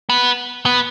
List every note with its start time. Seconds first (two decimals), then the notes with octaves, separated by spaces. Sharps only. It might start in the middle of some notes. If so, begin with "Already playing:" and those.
0.09 B3
0.66 B3